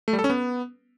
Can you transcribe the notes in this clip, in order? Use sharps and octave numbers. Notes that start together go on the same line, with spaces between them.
A3
G3
A4
C#4
B3